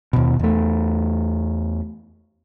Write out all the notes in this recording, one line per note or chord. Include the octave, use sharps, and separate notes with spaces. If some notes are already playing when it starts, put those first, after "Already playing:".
D#2 B2
E2 A3